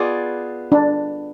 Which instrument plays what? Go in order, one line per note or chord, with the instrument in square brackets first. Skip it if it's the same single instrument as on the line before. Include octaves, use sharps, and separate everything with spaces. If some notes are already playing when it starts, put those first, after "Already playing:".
Already playing: [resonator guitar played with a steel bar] B3 F4 G#4 D5
[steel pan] D4